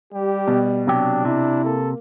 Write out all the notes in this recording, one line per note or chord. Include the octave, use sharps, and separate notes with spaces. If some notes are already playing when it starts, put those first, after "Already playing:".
G3 G4
B2
C3 F#3 D4 G4
C3 E4
A#3 A4